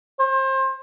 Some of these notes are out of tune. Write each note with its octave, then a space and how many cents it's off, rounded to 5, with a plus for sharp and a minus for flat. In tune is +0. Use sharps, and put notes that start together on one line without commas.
C5 +30